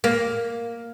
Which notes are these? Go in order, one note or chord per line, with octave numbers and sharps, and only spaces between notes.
A#3